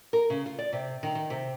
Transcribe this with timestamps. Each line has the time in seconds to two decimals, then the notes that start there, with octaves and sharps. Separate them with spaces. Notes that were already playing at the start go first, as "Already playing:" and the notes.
0.13 A#4
0.30 C#3
0.46 F4
0.59 D5
0.73 C3
1.03 D#3
1.15 D#3
1.30 C3